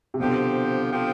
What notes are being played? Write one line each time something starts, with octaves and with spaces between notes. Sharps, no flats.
C3
B2 D3 F3 C4 G4
D3 F3 C4 G4